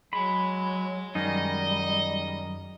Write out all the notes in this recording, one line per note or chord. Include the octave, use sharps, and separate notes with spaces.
F#3 G#3 B5
F#2 D#3 G3 G#3 D#4 D#5